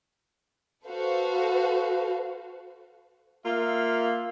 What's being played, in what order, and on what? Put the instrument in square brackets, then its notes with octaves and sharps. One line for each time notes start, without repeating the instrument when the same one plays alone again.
[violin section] F#4 A4 B4 C5 F5
[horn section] A#3 F4 E5